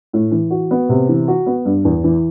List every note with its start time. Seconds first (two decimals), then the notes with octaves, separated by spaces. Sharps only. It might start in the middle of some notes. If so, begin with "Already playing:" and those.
0.13 A2
0.31 E3
0.50 F#4
0.71 B3
0.89 C3
1.09 E3
1.28 F#4
1.46 B3
1.65 G2
1.85 E2
2.04 E3